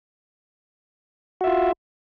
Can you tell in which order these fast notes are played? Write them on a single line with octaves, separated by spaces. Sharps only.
F#4 E5 F4